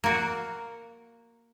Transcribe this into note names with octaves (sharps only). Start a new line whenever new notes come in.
A#3 F#4